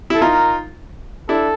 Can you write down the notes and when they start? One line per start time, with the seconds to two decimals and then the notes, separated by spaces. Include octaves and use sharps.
0.10 E4 A4
0.21 D#4 F4 A#4
1.29 D4 E4 A4